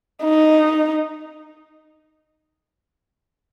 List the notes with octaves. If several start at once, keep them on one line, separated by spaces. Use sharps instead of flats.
D#4